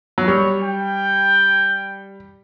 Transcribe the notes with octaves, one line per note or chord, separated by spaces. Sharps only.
F#3
G3 C#5
G5